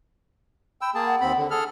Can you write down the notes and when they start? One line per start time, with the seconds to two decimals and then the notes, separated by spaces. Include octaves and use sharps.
0.81 G5 B5 E6
0.94 A#3 G#4 G5 A5
1.06 F#5
1.21 D#2 C4 B5
1.37 D3
1.51 G#4 A4 F6